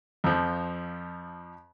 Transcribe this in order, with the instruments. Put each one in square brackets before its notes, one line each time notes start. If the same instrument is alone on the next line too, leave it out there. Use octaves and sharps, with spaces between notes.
[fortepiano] F2 F3